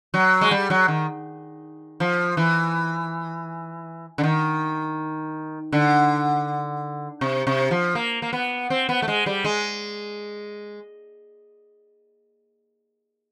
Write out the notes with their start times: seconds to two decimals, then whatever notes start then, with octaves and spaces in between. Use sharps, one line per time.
0.14 F#3
0.41 G#3
0.51 G3
0.70 F#3
0.88 D#3
2.00 F3
2.37 E3
4.18 D3
4.23 D#3
5.72 D3
7.21 C3
7.47 C3
7.71 F3
7.95 A#3
8.22 A#3
8.33 B3
8.70 C4
8.89 B3
9.02 A3
9.08 G#3
9.26 G3
9.44 G#3